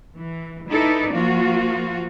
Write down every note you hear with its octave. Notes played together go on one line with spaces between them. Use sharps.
E3
D#4 E4 A4 B4 D5
F3 A#3 F4 F#4